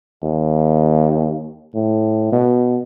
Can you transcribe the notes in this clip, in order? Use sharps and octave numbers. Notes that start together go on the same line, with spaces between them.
D#2
A2
B2